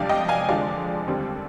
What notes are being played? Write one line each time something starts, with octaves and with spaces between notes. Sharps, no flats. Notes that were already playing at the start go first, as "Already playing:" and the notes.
Already playing: F2 C3 G3 D4 D5 F5
D#5 G5
F5 G#5
F2 D3 F3 G#3 D5 F5
D#2 D3 G3 C4